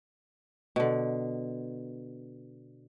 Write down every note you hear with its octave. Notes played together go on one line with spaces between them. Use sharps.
B2 D3